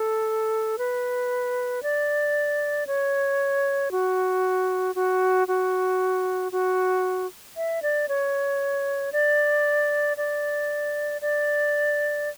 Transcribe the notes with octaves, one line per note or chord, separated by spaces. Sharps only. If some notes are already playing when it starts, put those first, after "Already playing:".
Already playing: A4
B4
D5
C#5
F#4
F#4
F#4
F#4
E5
D5
C#5
D5
D5
D5